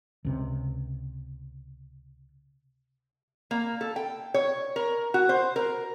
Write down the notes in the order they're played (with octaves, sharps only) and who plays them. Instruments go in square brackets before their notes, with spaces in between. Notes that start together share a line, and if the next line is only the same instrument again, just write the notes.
[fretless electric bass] C#2 C3
[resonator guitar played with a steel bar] A#3
A4
G5
C#5
A#4
F#4
C5
A#4